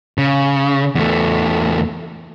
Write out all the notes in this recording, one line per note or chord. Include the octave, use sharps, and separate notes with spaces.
C#3
E2 A3